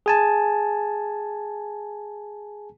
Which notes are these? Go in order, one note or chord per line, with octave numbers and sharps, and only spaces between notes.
G#4 G#5 A5